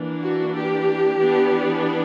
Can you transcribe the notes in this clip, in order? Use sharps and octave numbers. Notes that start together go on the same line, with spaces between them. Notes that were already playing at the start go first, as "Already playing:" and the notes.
Already playing: E3 A#3 D4
F#4
G4
E3 B3 D4